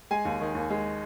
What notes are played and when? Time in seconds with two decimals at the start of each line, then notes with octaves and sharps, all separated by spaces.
0.11 G#3 G#5
0.25 D#2
0.41 D#3
0.55 D#2
0.70 G#3